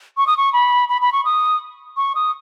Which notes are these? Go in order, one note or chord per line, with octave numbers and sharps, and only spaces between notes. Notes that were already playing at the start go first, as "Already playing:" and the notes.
C#6
D#6
C#6
B5
B5
B5
C#6
D#6
C#6
D#6